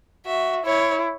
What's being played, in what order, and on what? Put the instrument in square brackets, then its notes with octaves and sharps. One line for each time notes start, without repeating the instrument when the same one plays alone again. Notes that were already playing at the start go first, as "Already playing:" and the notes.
[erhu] F#4 [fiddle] E5
[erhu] E4 [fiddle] C#5